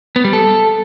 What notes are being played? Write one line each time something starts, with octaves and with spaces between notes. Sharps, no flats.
B3
G3
A4